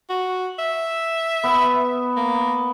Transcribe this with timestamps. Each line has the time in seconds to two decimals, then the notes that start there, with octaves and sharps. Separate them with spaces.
0.10 F#4
0.59 E5
1.44 B3
2.16 A#3